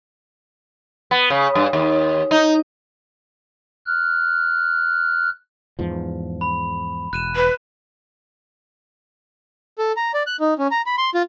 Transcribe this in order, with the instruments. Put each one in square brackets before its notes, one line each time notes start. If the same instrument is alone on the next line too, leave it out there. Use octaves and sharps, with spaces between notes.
[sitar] B3
C#3
G2
D#2
D#4
[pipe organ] F6 F#6
[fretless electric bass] E2 G#2 F3
[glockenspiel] B5
[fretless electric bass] E1 [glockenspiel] F#6 D#7 E7
[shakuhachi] B4
[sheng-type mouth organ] A4
A#5
D5
F#6
D#4
C#4
A#5
B5
C6
F4